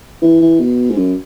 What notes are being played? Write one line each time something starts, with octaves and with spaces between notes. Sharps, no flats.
E3
E3
B2
G#2
F#2